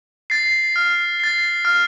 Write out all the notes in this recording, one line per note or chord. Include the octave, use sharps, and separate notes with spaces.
A6 C7
F6
A6 C7
F6